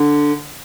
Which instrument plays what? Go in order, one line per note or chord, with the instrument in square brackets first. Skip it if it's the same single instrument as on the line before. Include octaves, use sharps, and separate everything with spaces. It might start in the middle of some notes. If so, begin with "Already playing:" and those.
Already playing: [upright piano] D3